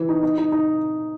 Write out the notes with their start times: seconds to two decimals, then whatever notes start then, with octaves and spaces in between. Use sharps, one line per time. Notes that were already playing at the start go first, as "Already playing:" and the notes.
Already playing: E3
0.09 D#4
0.23 D#4
0.38 D#4
0.52 D#4